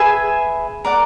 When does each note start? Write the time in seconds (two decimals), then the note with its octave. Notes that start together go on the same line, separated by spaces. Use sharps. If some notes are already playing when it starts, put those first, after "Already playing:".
Already playing: G#4 B4 E5 G#5
0.84 A#4 D5 F#5